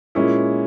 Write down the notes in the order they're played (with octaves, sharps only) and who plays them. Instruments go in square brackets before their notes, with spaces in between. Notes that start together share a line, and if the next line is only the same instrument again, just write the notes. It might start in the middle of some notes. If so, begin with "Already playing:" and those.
[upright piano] A#2 G#3 C#4 E4